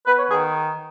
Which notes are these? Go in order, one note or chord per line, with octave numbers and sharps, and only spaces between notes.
B3 B4
C#5
D#3 G#4